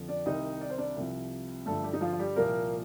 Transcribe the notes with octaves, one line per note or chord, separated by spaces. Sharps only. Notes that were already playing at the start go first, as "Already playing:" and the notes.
Already playing: F2 D3 F3
D4 D5
C2 C3 D#3 D#4 D#5
D5
C5
D4 D5
C2 C3 F3
G2 D3 F3 A3 A4
G3 G4
D#4
F3 F4
F4
G3 G4
C2 A#2 F3 A#3 A#4